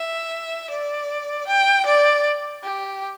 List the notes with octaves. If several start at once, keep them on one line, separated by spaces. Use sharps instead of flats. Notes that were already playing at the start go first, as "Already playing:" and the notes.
Already playing: E5
D5
G5
D5
G4